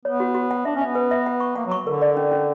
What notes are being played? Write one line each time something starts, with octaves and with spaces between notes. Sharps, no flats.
B3 C#5
F#4
F#4
F#5
D4 E5
C#4
B3 E5
B4
E5
F#5
C#6
A#3 F#5
F#3
C#6
D3 A#4
D5
C#4
C#4